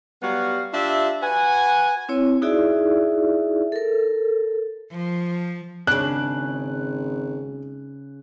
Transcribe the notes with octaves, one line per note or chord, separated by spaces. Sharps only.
F#3 G3 B3 F#4 F5
D4 F4 G4 E5
F#4 B4 F#5 G#5
C4 E4 C#5
D#4 E4 F#4 G#4 D5 E5
A4 A#4
F3
G#1 C#3 D4 F#6